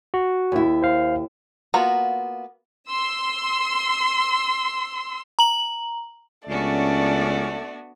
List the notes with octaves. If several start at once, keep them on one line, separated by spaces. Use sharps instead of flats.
F#4
D#2 E4
C5 F5
A#3 B3 F4 F#4 A#5
C6 E6
A#5 F#7
C#2 A3 B3 C#4 D4 F#4 D5